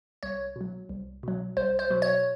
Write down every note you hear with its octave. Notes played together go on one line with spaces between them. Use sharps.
C2 C#5
B2 F#3
C2
B2 F#3
C2 C5
C5
B2 F#3
C#5